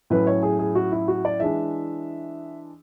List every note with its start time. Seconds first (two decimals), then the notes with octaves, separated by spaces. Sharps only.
0.10 A2 F#3 C#4 B4
0.27 C#5
0.43 G#4
0.59 G#4
0.75 F#4
0.92 E4
1.08 F#4
1.25 D5
1.40 E3 G#3 D4 E5